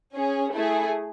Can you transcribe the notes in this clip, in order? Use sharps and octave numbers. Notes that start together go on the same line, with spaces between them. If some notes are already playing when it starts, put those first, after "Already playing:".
C#4 G#4
A3 E4 G#4